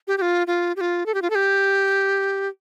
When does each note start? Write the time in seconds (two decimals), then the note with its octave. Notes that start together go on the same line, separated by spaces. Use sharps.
0.08 G4
0.18 G4
0.22 F4
0.47 F4
0.76 G4
0.81 F4
1.06 A4
1.14 G4
1.22 F4
1.30 A4
1.35 G4